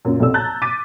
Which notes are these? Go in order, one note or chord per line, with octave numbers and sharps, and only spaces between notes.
F#2 A#2 C#3
B1 C3 A4 D5 E6
A5 A#5 F#6 G6 A6
D6 A6 B6 D#7